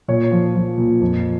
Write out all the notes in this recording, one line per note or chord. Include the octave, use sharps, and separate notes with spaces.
A#2 C#5
F3
F3
A#2
F2